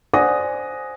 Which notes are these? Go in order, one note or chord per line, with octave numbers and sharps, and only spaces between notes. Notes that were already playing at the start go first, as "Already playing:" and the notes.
C5 D5 F#5 G#5 D#6 A#6